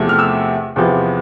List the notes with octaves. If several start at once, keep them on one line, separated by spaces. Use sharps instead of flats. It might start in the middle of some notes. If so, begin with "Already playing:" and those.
Already playing: E2 C3 F3 A3
F6
E6
E2 C3 F3 B3